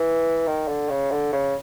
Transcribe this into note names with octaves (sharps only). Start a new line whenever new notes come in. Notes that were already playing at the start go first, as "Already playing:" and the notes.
Already playing: E3
D#3
D3
C#3
D3
C#3